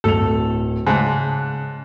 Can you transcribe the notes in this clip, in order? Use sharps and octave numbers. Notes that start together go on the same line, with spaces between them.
D1 A2 A4 F7
G#2 C#3 A5 F#6